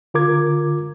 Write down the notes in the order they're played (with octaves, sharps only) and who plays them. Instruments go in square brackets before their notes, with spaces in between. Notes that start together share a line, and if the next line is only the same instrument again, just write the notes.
[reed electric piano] D3 F4 A#4 D6 G#6